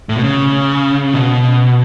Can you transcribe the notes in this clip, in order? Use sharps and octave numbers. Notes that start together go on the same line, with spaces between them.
A2
B2
C#3
B2